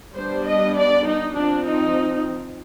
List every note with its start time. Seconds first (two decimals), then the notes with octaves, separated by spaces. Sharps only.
0.15 G3 B3 D4 C5
0.45 D#5
0.75 D5
1.05 D#4
1.34 F3 C4 D4
1.64 D#4